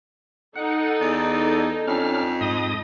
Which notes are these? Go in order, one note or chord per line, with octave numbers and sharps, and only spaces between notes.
D#4 A4 F#5
E2 D5
F2 C#4 D4 F6
G#2 D#5 D#6